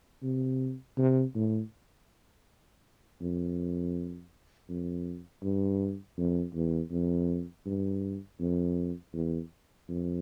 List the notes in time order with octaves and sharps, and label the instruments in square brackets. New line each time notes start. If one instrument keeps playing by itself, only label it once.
[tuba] C3
C3
A2
F2
F2
G2
F2
E2
F2
G2
F2
E2
F2